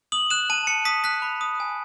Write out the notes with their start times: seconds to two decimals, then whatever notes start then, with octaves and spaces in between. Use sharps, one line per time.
0.12 D#6 F#7
0.30 F#6 E7
0.50 A5 D#7
0.67 A5 C#7
0.85 D#6 B6
1.04 F#6 B6
1.22 B5
1.41 D#6
1.60 G#5